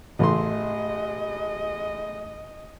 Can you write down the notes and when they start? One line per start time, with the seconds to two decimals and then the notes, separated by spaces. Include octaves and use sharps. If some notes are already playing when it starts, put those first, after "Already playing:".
0.19 A1 A2 C#3 E3 G#3 A3 D#5 C6